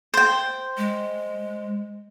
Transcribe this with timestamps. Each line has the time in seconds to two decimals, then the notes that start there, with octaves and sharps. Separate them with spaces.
0.14 C5 G5
0.78 G#3